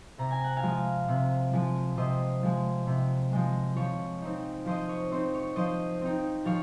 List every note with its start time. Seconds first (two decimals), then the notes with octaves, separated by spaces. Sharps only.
0.18 C3 A#5
0.31 G#5
0.44 F#5
0.56 F5 G#5
0.63 F3 G#3
1.08 C3
1.53 F3 G#3
1.97 C3 C5 D#5
2.43 F3 G#3
2.87 C3
3.33 F3 G#3
3.76 F3 C#5
4.22 C4 D#4
4.65 F3 C5 D#5
4.89 C#5
5.11 C4 D#4 C5
5.34 C#5
5.56 F3 C5 D#5
6.01 C4 D#4
6.45 F3 C#5 F5